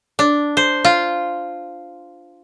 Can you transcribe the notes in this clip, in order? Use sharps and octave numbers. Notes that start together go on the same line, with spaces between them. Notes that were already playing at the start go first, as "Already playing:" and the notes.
D4
C5
F4